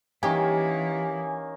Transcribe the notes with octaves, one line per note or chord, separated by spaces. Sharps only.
D#3 E3 A#3 C#4 G4 G#5